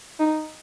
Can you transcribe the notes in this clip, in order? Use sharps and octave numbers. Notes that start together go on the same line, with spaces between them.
D#4